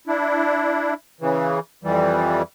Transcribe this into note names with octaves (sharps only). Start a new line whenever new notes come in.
D4 E4
C#3 E3
F2 E3 G3